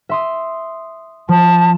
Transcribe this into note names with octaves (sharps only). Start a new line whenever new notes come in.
E5 C6 D#6
F3 A5